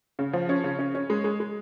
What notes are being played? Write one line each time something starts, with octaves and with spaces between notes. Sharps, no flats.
C#3
F3
C#4
C#3
C#4
C#4
G#3
G#3
G#3